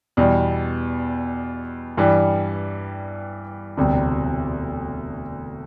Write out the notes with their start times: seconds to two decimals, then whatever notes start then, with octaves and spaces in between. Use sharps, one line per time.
0.17 E2 B2 G3
1.98 G2 E3 G3
3.77 E1 D2 C3 G3